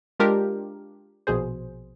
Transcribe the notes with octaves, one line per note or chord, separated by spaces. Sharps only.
G#3 D4 F4 G4 A#4
A#1 B2 G#4 C5